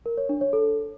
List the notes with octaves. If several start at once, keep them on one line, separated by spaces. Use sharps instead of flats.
A#4
C#5
D4
C#5
A4